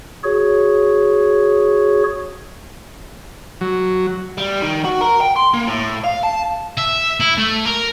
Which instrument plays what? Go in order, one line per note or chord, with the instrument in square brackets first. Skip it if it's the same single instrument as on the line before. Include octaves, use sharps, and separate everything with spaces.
[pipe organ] F#4 G#4 C#5
[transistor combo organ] F#3
[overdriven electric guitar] G3
D#3
F#4
A#4
G5
C6
A#3
A2
F5
A5
[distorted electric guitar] E5
E4
A3
A#4